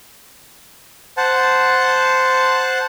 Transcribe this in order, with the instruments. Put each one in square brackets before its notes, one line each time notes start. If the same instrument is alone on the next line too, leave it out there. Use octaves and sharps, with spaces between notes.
[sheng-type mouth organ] C5 F#5 A5